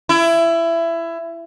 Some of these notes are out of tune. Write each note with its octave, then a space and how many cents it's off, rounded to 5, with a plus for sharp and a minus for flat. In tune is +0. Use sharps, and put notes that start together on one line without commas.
E4 +20